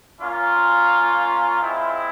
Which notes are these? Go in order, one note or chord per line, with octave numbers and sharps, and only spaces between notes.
A#3 C#4 F4
G#3 C4 E4